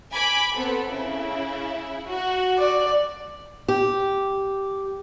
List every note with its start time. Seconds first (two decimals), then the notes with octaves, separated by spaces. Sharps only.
0.12 G#5 B5 D6
0.57 B3 C4 A4
0.90 C#3 E4
2.09 F#4
2.59 D5
3.68 G4